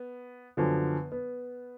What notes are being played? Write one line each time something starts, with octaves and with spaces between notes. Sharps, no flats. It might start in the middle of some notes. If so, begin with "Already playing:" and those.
Already playing: B3
F#2 D3 F3 B3
B3